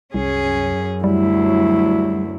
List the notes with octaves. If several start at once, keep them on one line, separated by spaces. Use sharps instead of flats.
C2 F#2 C#4 G#4
D2 F#3 G3 E4